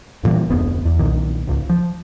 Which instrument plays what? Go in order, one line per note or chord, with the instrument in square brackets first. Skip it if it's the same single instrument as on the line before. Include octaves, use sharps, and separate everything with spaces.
[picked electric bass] G1 A#2 E3 G3
F1 D2 B3
E2
B1 A#2 D#3
G#1 C#2
F3